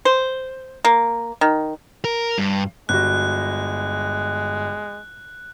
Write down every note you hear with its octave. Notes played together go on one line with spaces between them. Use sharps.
C5
A#3
D#3
A#4
G2
G1 G#3 F#4 F#6